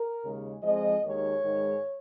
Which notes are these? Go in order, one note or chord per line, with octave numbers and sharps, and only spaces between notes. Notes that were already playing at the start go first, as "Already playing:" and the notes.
Already playing: A#4
D#2 C#3 G#3
F2 F3 G#3 D#5
D#2 D#3 G#3 C#5
G#2 D#3 G#3